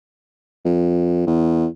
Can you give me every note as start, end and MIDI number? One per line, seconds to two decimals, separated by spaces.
0.65 1.27 41
1.27 1.66 40